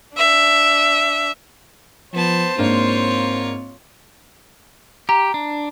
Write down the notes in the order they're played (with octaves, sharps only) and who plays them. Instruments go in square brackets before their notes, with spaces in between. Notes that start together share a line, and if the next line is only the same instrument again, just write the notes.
[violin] D4 E5
[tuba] F3 [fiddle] B3 A5 [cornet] C5
[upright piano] G#2 A#3 D4 [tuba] C4 [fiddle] F4 C#5
[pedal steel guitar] G4 [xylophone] A#5
[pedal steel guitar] D4